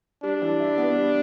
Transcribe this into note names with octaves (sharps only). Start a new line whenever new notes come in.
G3 D4
E3
E4
B3
G3